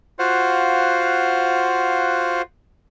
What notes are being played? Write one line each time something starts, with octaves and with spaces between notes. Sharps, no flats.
F4 F#4 C5 F5 F#5